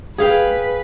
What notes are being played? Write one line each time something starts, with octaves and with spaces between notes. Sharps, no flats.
G#4 B4 F5 G5